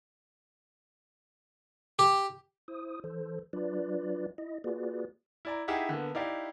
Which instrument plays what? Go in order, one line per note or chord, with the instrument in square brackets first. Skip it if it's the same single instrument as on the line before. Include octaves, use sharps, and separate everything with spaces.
[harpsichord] G4
[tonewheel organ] E4 C5 D#6
E3 A4 C5
F#3 D4 F4 B4 D5
E4 D#5
A#3 F4 F#4 G#4 B4 D5
[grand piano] E4 D5 A#5
D#4 E4 G4 G#4 E5 F#5
D3 A#3 B3
D#4 E4 G4 D5 F5